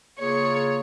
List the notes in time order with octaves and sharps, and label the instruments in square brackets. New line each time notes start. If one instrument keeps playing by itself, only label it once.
[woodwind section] C#3 A#3 F4 G#4 [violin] C#5